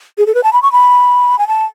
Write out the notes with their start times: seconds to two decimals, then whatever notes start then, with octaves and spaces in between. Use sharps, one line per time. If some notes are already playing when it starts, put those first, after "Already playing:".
0.18 G#4
0.26 A4
0.35 B4
0.43 A5
0.53 B5
0.62 C#6
0.72 B5
1.38 G#5
1.47 A5